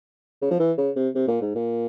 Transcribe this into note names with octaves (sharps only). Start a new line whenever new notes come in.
C#3
F3
E3
C#3
C3
C3
A#2
G#2
A#2